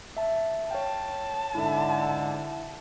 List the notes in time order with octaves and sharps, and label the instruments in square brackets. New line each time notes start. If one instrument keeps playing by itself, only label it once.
[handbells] E5 A5
[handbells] C#5 F5 G5 [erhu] A5
[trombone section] G#2 D3 [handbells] E4 E5